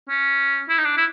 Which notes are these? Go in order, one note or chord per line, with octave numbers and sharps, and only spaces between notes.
C#4
E4
D#4
D4
E4